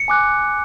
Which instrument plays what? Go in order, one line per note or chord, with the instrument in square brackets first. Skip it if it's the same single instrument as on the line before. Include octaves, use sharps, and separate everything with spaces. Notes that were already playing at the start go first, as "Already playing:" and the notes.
Already playing: [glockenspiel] C#7
G#5 D6 F#6